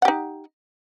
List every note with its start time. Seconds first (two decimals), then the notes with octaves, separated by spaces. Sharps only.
0.02 F#5
0.05 G4
0.08 D#4